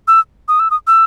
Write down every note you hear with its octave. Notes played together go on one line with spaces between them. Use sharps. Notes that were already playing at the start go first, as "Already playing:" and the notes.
E6
D#6
E6
D#6
E6